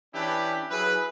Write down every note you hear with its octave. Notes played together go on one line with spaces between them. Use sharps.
E3 C#4 D4 E4 G4 B4
F#3 E4 G#4 B4